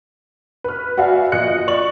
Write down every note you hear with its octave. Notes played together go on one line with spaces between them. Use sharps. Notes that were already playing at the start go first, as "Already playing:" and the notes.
B4 F6
F#4 D5 E5 F5 G#5
A#1 D#5 F#6 C#7
D5 C#6 F#7